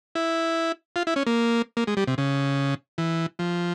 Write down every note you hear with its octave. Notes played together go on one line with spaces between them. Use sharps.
E4
F4
E4
C#4
A#3
A#3
G#3
G3
C3
C#3
E3
F3